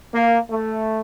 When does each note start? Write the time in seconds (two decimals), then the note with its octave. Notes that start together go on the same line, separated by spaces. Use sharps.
0.13 A#3
0.49 A3